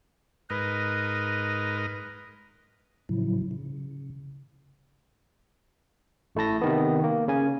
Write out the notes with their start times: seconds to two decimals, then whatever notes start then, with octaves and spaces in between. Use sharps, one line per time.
0.50 G#2 A#4 B4 D#5
3.09 A2 C#3 F3 F#3 E4
3.51 C#3
6.35 A1 A3 E4 A5 A#6
6.61 C3 D#3 B3
7.04 A#3
7.28 C#3 G#5